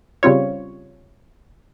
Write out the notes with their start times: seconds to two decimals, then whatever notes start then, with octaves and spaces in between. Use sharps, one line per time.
0.23 C#3 G3 C4 F4 C#5